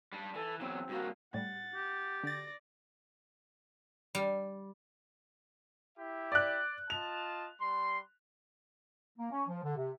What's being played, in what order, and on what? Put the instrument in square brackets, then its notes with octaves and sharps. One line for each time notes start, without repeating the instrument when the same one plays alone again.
[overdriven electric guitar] G3 D4
[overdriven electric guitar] E3 [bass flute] A4
[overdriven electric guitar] E2 F#3 [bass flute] C4
[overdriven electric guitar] G2 A#3 [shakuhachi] F#4
[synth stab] A2 G3 [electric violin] F#5 A6
[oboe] G4
[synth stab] D3 A6 [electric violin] D5 A#6
[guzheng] G3
[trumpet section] E4 G4 E5
[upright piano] D5 F#6
[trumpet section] F4 D#5 A5 [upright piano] F7
[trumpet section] G3 C6
[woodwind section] A#3
C#4
F3
D3
C3